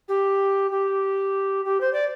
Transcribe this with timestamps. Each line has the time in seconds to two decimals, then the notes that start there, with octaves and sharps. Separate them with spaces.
0.08 G4
0.71 G4
1.65 G4
1.81 C5
1.93 D5